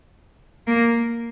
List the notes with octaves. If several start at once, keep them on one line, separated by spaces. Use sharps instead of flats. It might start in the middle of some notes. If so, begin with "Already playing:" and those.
A#3